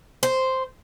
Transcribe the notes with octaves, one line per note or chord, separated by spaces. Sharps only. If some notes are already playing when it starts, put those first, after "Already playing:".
C5